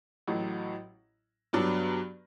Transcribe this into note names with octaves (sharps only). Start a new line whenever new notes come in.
A1 A2 F#3
G2 F#3 B3 D4